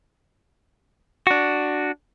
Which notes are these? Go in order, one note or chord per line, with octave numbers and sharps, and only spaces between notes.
D4 F#4